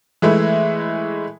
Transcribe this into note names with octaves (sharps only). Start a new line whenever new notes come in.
E3 G#3 A3 E4